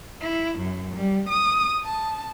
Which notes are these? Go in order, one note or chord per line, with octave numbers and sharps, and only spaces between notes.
E4
F#2
G3
D#6
A5